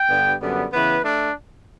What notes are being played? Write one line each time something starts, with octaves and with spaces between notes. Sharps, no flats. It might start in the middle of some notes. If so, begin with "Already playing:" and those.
Already playing: G5
G2 D3 G3 B3
F#2 D3 G3 B3
C#3 E3 B3 B4
A3 D4